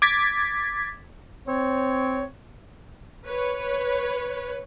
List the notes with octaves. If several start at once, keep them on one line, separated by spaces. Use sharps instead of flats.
D6 G#6 A6 B6
C4 C#5
B4 C#5